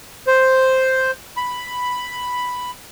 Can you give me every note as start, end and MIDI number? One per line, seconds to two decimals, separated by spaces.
0.27 1.11 72
1.37 2.71 83